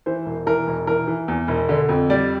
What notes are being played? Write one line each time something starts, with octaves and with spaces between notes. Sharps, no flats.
E3 C5
E1
E3 A#4
E1
E3 A#4
E3
E2
E1
D3
F2
G3 D5